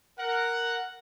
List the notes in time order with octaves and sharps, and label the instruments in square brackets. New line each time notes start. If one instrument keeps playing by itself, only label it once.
[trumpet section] A#4 F#5